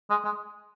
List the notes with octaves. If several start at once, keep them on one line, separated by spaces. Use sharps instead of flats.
G#3
G#3